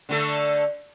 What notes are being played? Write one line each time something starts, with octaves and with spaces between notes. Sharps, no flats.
D3 A3 A4